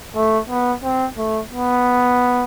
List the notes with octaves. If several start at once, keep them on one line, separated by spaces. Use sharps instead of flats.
A3
B3
C4
A3
B3